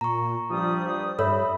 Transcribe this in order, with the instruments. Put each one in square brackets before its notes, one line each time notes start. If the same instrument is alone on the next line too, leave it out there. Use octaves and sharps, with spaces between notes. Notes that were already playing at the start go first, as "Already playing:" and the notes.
[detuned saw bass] A#2 [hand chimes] A#5 C#6
[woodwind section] G2 G3 D#6 [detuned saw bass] F3
[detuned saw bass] G2 [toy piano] A4 C#5 [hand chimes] E5 E6 [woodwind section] B5